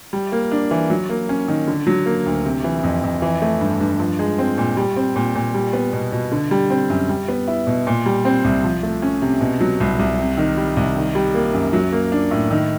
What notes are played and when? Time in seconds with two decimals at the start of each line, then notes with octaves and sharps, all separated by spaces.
0.13 G3
0.32 A#3
0.52 D4
0.71 E3
0.90 F#3
1.10 A#3
1.29 C#4
1.48 D#3
1.67 D3
1.87 F#3
2.06 A#3
2.26 D2
2.45 C3
2.64 E3
2.83 F2
3.03 F2
3.22 E3
3.42 A3
3.61 G2
3.80 G2
3.99 F3
4.19 G#3
4.38 C4
4.58 A#2
4.77 G3
4.96 C4
5.16 A#2
5.35 A#2
5.54 G3
5.73 B3
5.93 B2
6.12 B2
6.32 D3
6.51 G3
6.70 C4
6.90 F#2
7.09 G3
7.28 B3
7.48 E4
7.67 B2
7.87 A#2
8.06 G3
8.25 C4
8.44 C2
8.64 F3
8.83 A3
9.02 C#4
9.22 C3
9.41 B2
9.60 F#3
9.80 C2
9.99 C2
10.18 C3
10.37 D#3
10.57 G3
10.77 C2
10.96 D#3
11.15 G3
11.34 A#3
11.54 F#2
11.73 F#3
11.92 A#3
12.12 D4
12.31 A2
12.51 D#3